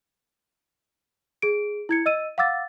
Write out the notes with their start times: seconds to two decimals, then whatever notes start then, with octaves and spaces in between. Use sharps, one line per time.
1.42 G#4 D7
1.89 E4 G#6 C#7
2.06 D#5 E6 D#7
2.38 F5 F#5 D6 E6 A6